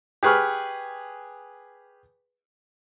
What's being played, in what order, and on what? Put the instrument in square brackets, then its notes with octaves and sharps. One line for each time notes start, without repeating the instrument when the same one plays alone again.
[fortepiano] G4 G#4 B4 C#6 F6